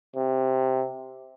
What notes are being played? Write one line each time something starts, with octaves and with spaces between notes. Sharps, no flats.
C3